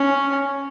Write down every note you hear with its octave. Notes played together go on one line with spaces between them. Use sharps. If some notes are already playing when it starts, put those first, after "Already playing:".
Already playing: C#4